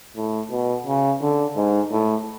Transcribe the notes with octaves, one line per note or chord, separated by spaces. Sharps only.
A2
B2
C#3
D3
G#2
A2